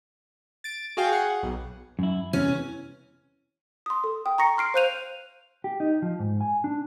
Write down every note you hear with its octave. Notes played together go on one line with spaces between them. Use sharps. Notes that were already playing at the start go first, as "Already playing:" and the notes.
A6 D7
F#4 G#4 F5 G5
G#4 F#5
B1
F#2 E4
E2 C3 E3 C#4
C6 D#6
A4
G5 D#6
A#5 C#6 A#6 C#7
C6 F6 C7 D7
C5 F5 F#6 G6 D#7 F7
G4
D#4
F3
G#2
G#5
D4